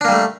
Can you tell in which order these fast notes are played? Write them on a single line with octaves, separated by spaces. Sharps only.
D4 A#3 G3 A3